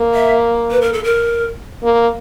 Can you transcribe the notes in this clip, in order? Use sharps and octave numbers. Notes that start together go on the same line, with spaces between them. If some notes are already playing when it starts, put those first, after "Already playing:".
Already playing: A#3
E5
B4
A#4
A4
A#4
A#3